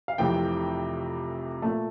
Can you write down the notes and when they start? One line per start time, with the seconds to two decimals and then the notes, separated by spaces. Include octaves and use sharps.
0.08 F5
0.18 F1 F2 C3 E3 G5
1.62 A#2 A3 A5